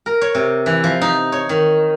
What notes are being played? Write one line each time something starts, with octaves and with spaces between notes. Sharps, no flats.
A#4
C#5
C3
E3
F3
D#4
C#5
D#3